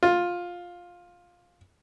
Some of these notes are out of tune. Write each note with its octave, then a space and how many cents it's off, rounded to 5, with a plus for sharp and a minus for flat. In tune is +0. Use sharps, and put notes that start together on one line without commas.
F4 +10